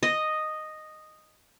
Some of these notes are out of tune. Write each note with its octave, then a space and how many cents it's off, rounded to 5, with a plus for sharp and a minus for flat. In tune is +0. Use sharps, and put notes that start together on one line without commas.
D#5 -5